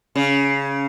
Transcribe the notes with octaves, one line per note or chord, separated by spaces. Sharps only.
C#3